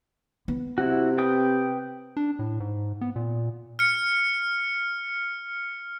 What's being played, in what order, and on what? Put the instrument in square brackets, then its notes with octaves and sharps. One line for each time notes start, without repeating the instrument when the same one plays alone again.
[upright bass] B3
[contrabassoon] C3 [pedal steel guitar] E4 F#4
[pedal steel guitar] B4 G5 D#6
[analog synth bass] D4
A2
G#2
B3
A#2
[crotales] F6 C#7